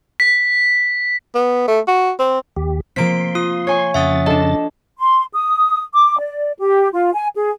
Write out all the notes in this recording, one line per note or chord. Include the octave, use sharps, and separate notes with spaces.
B6
B3
A3
F#4
C4
D#2 G4
F3 A#3 C4 C6 B6 D7
F4 D#6
C#5 G#5 C#6
F2 C#3 E5 F#5 D#6 A6
D4 A4 D#5
C6
D#6
D6
D5
G4
F4
G#5
G#4